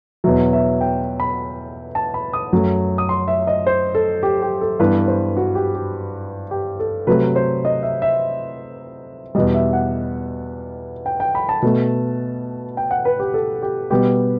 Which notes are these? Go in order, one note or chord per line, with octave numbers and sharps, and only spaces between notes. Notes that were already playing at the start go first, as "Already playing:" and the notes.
E2 B2 F#3 E5
E5
G5
B5
A5
B5
D#6
F#2 F#3 A3
D#6
C6
E5
D#5
C5
A4
G4
G4
A4
G2 E3 B3 B4
C5
F#4
G4
G4
G4
A4
C3 F#3 A3 B4
C5
D#5
E5
E5
E2 B2 G3 D#5
E5
F#5
G5
G5
B5
A5
B2 A3
G5
F#5
B4
G4
A4
G4
B2 G3 B3 G4